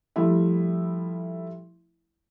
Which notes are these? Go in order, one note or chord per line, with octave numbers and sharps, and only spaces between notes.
F3 G3 A3 E4 E5